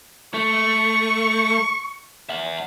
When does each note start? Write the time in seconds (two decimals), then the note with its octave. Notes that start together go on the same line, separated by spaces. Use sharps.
0.34 A3 C#6
2.29 E5 F#5